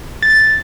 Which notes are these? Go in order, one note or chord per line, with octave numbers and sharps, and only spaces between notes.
A6